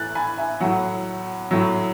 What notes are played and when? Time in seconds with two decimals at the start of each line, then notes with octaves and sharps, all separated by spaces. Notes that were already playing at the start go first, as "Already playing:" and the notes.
Already playing: A2 E3 F#6 A6
0.15 G#5 B5
0.38 E5 G#5
0.60 A2 F#3 F#5
1.51 A2 F#3